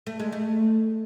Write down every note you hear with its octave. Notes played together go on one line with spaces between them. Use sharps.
A3
G#3
A3